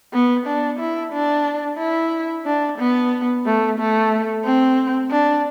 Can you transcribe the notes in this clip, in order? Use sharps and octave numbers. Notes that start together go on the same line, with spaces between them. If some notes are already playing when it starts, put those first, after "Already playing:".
B3
D4
E4
D4
E4
D4
B3
A3
A3
C4
D4